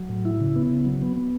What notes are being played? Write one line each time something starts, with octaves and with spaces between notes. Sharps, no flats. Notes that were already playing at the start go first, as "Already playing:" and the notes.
Already playing: F#3
A2
E4
C#3
B3
C#3
F#3
B3
B3